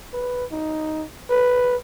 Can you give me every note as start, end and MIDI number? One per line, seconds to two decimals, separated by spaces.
0.14 0.45 71
0.52 1.04 63
1.31 1.76 71